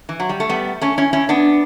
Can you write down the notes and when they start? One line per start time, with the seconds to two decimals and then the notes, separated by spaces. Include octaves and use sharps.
0.09 E3
0.20 F#3
0.29 G3
0.40 A3
0.49 G3 B3
0.81 A3 C#4
0.98 C#4 E4
1.13 C#4 E4
1.29 B3 D4